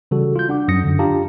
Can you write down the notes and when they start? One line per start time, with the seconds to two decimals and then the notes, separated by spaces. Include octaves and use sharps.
0.11 C#3 E3 G3 F#4 A4
0.36 F4 G6
0.49 D4 F#5 D6
0.68 F#2 F#3 D#6 A#6 C#7
0.84 F#2 D3
0.99 D4 F4 G4 F5 A5 A#5